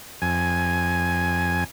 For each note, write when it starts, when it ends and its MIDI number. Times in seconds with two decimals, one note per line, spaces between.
0.22 1.64 41
0.22 1.64 80